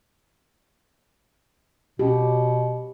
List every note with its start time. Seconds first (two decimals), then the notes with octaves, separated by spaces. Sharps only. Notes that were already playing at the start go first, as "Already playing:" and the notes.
1.99 B2 C#4 F#4 G4